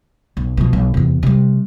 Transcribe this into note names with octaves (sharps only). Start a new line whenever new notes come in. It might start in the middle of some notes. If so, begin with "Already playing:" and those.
B1
B2 F3
B1
E2 C3
C3 G3